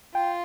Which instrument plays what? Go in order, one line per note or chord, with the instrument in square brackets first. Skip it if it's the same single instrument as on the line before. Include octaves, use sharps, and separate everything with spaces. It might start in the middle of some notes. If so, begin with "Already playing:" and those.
[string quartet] F4 [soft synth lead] G5